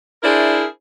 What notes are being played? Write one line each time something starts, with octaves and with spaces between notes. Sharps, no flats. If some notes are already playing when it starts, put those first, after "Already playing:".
D4 E4 G#4 A#4 C5 E5